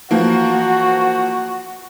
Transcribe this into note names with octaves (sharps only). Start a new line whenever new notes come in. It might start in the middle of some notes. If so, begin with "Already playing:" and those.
E3 F3 A#3 F#4